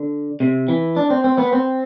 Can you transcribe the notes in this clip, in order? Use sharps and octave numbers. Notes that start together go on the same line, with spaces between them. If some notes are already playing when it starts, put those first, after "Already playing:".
Already playing: D3
C3
E3
D4
C4
C4
B3
C4